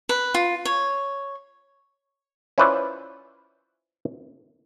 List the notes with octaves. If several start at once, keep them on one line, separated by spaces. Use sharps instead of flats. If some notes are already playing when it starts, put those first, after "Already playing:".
B4
F4
C#5
C#4 E4 F4 B4 C5 D5